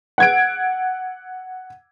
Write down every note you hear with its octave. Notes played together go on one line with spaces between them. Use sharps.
F#5 G#6 D7